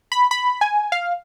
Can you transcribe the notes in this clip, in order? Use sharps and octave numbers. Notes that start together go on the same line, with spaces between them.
B5
B5
G#5
F5